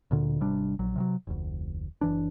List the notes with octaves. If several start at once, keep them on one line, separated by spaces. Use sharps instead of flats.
D2 A#2 D3
G#1 C3 G3 D4
A#1 F#3
C3 D#3 F#3
F1 D2
F#1 E3 D4